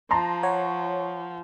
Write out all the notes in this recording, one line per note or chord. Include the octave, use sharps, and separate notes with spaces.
F3 A5 A#5 C6
C#5 F#5